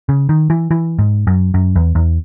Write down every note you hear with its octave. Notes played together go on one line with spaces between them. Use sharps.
C#3
D#3
E3
E3
G#2
F#2
F#2
E2
E2